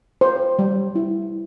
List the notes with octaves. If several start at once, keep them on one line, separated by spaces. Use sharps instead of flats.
C5
G3
E4